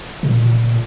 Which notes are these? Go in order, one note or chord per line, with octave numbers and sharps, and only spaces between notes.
A#2